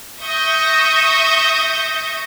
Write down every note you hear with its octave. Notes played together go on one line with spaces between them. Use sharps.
E5 C#6 D#6 G6 A#6